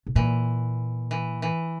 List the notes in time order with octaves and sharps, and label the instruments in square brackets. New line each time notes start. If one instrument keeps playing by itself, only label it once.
[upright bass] B2
[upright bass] A#2 [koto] E3
[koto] E3
E3